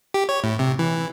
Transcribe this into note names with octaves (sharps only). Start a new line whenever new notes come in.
G4
C#5
A2
C3
E3